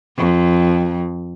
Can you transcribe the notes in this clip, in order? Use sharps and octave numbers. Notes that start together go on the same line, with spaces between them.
F2